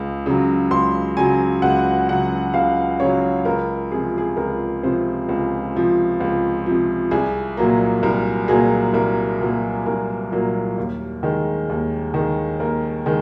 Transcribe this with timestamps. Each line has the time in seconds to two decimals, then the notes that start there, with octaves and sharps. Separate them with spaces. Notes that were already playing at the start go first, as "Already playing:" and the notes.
Already playing: C#2
0.26 C#3 F#3
0.71 C#2 C6
1.17 C#3 F#3 G#5
1.62 C#2 F#5
2.09 C#3 F#3 F#5
2.54 C#2 F5
3.00 C#3 F#3 C#5
3.45 C#2 A#4
3.91 C3 F3 G#4
4.18 G#4
4.37 C#2 A#4
4.83 C3 F3 C5
5.29 C#2
5.75 C3 F3
6.20 C#2
6.66 C3 F3
7.11 C2 G#4
7.57 A#2 F#3 A#3
8.03 C2 A#4
8.48 A#2 F#3 A#3 G#4
8.94 C2 A#4
9.41 A#2 F#3 A#3
9.86 C2 A#4
10.32 A#2 F#3 A#3
10.78 D#2
11.23 D#3 G#3
11.69 D#2
12.14 D#3 G#3
12.60 D#2 A#4
13.06 D#3 G#3